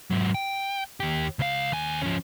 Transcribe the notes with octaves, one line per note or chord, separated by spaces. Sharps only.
G#2 F#3
G5
D#2 G4
C#2 F5
D#2 G#5
F3 C#4